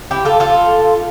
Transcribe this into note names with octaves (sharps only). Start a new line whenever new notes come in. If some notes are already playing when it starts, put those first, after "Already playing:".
E4 G4
F4 A4
F4 A4